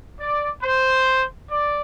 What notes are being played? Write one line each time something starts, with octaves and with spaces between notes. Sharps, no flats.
D5
C5
D5